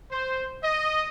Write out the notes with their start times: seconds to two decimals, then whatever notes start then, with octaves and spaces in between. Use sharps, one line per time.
0.10 C5
0.63 D#5